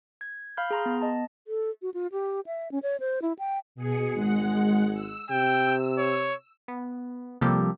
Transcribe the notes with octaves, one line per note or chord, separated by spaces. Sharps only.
G#6
F5 B5 F6 G6
G#4 A#5 C6
B3
D#5 A5
A4
F#4
F4
G4
E5
C#4
C#5
C5
E4
G5
B2 G#4 C#7
G#1 G#3 F#5
E6
C3 G5
C#5
B3
C3 F3 G3 A#3 G4 A4